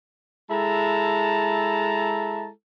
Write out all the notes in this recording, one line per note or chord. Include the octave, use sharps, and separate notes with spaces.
G#3 E4 A4 A5 A#5